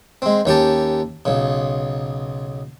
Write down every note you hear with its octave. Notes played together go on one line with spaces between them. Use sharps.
G#3 C4
D#2 C#4 G4 A5
B1 C#3